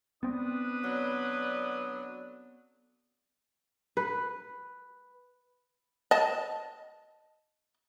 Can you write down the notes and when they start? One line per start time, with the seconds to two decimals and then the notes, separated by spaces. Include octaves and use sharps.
0.23 B3 C4 D4 B4 D#6
0.84 D3 F#3
3.97 B4
6.11 D#5 A5